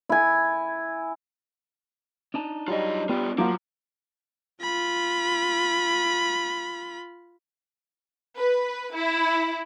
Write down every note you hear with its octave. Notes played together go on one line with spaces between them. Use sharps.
E4 G#5
D4 D#4 A5
F#3 G3 F4 D#5
B1 G3 B3 D4 F4
F3 F#3 A#3 F4 D6
F4 B5
B4
E4